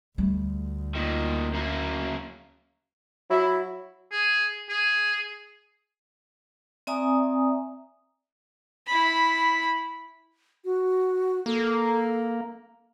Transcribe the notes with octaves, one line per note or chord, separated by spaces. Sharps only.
D2 G3 A3
A#2 D#3
F#2 A#3
F#3 E4
G#4
G#4
C4 D5 E5 G#5 A#5 D#6
E4 B5
F#4
A#3 A4